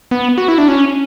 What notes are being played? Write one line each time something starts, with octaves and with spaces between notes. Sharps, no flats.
B3
F#4
E4
D4
C#4